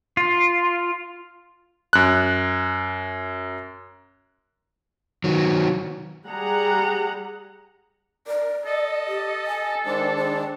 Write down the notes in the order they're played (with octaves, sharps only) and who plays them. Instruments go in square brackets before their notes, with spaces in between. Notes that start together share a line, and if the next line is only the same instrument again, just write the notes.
[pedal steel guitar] F4
[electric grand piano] F#2 F#6
[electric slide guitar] D#3 F#3
[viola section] G3 G#4 F#5 A#5
[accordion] A#4 [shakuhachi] D5
[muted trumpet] A4 [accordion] D#5
[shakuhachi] G4
G#5
[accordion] D#3 G#3 D4 [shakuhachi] C5
[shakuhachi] C5